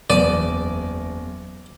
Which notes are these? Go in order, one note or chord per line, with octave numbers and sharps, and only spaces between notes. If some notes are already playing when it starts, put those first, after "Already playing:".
F#1 E2 D5 D#7